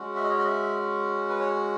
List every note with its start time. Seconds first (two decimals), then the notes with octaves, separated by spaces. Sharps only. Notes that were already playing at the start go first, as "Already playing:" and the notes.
Already playing: G#3 C#4 F#4
0.16 E5
0.24 D#5
0.31 C#5
0.38 D#5
0.47 E5
1.29 B4
1.40 C#5